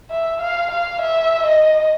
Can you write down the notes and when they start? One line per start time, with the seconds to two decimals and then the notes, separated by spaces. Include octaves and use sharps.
0.10 E5
0.41 F5
0.70 F5
1.01 E5
1.46 D#5